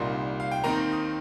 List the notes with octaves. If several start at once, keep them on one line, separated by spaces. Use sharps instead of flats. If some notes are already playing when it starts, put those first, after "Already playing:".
Already playing: C2 A#2 G3 A#3 D#4 C6
F5
G5
D#2 D#3 C4 D#4 A#5
D#6